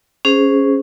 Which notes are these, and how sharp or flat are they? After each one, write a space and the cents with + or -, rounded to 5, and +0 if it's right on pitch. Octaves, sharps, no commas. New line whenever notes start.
C#4 +0 G#4 +0 C5 -5